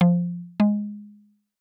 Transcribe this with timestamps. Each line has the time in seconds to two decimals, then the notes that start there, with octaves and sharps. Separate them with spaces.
0.01 F3
0.60 G#3